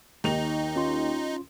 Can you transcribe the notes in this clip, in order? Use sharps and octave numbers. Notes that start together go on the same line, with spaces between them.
D#2 D#4 F7
C#4 F4 C6